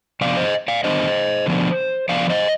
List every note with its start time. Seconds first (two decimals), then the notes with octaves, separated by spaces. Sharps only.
0.21 C3 F3 B3 D4 D5 F5
0.37 C5 D#5
0.68 D5 F5
0.84 D#3 B3 D4 C5 D#5
1.46 D3 F3 B3 D4
2.09 F3 B3 D4 D5 F5
2.30 C5 D#5